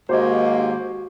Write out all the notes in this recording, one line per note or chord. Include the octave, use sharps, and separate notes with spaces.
D#2 G#2 A#3 F#4 G4 C5 D#5 G#6